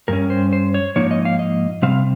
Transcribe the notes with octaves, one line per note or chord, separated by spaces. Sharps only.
G2 G3 C#4 A#4
C5
C5
C#5
G#2 F3 A#3 D#4 C#5
D#5
F5
D#5
C3 G3 C4 F5